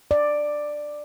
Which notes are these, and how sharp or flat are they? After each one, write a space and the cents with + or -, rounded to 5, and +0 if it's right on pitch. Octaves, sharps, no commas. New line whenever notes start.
D5 +10